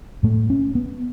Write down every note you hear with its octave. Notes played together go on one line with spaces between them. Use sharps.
A2 A3
C#4
B3